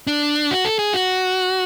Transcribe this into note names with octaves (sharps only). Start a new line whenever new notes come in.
D4
F#4
A4
G#4
F#4